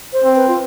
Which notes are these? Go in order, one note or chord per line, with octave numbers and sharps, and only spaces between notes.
C5
C4
B4
F4